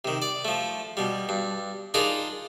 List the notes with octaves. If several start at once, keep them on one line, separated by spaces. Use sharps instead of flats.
C3 D#3
D5
F3 A3
B2 G3
G2
D4 D#4 F4 G#4 A#4